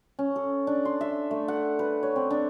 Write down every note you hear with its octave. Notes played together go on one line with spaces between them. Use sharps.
C#4
A4
D4
C6
E5
A3
F#5
B4
C#5
C4
D4